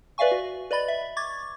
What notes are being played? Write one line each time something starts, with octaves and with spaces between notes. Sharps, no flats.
B4 D5 E5 F5 G#5 C#6
F#4
B4 D5 D#5 B5 A6
E5
C#6 D6 G#6 A6